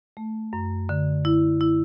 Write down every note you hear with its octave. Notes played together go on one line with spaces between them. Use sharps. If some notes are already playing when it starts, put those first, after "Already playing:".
A3
F#2
D3
E4
E4